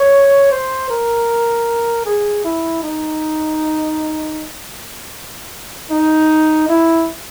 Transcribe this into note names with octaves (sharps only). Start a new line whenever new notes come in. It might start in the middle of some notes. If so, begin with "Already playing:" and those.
Already playing: C#5
C5
A#4
G#4
E4
D#4
D#4
E4